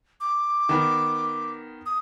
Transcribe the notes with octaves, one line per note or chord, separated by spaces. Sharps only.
D6
D#3 B3 A#4
D#6